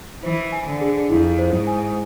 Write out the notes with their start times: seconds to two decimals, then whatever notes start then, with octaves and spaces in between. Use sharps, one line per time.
0.23 E3 C5
0.52 G#5
0.67 D3
0.81 G#4
1.10 F2 E4
1.38 C5
1.52 G#2
1.67 G#5